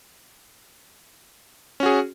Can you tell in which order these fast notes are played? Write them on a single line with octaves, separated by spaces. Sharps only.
C#4 F#4 G#4